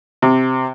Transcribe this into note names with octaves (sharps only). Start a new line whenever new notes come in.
C3